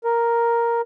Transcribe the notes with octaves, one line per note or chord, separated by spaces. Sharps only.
A#4